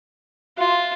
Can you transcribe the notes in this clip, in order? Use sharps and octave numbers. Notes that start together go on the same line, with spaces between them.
F4 F#4 E5 C6